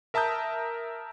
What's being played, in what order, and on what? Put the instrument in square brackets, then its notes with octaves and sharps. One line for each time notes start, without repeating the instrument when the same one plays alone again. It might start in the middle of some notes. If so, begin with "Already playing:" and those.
[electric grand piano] A#4 E5 A5 A#5 D#6 G6